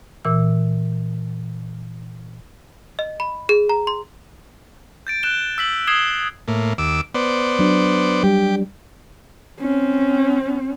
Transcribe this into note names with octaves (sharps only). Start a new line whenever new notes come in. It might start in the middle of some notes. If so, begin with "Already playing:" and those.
A#2 E3 E6
D#5
B5
G#4
A#5
C6
G6 A6 D7
F#6 G6 E7 G7
E6 B6 F#7
D#6 G#6 C7 E7 G7
A2 A#3
D#2 D6 E6
B3 C5 D5
F#3 D4
G3 G4
C4 C#4